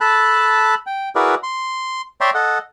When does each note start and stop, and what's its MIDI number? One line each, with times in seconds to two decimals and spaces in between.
0.01 0.75 69
0.01 0.75 81
0.01 0.75 83
0.01 0.75 90
0.87 1.09 79
1.16 1.35 64
1.16 1.35 66
1.16 1.35 68
1.16 1.35 70
1.16 1.35 71
1.16 1.35 74
1.43 2.02 84
2.21 2.30 73
2.21 2.30 74
2.21 2.30 76
2.21 2.30 79
2.21 2.30 82
2.21 2.30 84
2.35 2.58 69
2.35 2.58 75
2.35 2.58 78